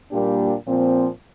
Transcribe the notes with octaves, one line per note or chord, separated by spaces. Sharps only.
A#2 G3 A#3 D4 G4
A#2 F3 C4